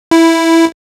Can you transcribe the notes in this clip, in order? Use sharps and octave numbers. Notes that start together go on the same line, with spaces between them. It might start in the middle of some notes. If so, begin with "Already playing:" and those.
E4